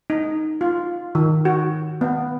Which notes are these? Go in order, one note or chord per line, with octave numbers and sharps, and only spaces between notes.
D#4
F4
D#3
F#4
B3